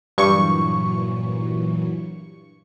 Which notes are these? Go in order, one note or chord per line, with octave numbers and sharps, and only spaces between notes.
G2 A#2 E3 F#3 C#6